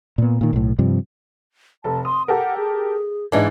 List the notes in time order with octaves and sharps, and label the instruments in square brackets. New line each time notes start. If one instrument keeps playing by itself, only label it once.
[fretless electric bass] A#2 B3
A#2 D#3
B1 A2
G2 C3 F3
[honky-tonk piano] F1 A4 [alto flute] A5
[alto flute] C6 [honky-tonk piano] D#6
[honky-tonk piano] G4 A4 A#4 [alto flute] F#5
[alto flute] G#4
[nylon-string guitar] G#2 E3 [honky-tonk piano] D4 D#4